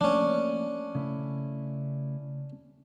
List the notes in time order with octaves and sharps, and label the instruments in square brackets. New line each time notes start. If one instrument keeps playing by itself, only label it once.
[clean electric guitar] F3 A3 A#3 [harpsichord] C#4 D4
[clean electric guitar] C#3 A3 E4